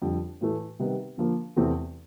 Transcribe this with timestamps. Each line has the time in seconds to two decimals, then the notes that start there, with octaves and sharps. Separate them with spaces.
0.02 F2 D3 G3
0.41 A2 E3 A3
0.79 C3 D#3 G3 B3 D#4
1.17 D3 F3 A#3
1.56 E2 C3 E3 A3 C4